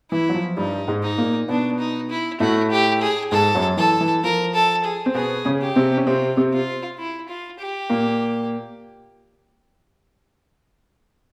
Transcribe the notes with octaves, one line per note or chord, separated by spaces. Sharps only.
E3 E4
F#3
F3
G2 G3 D#4
G#2 G#3
D#4
A#2 A#3
B2 B3 D4
D#4
E4
A2 A3 F#4
G4
G#4
G#2 G#3 A4
F#2 F#3
E3 A4
E3
F3 A#4
A4
G#4
C4
B2 B3 G#4
C#3 C#4
G4
C3 C4
C#4
C3 C4 F4
C3 C4
F4
E4
F4
G4
A#2 A#3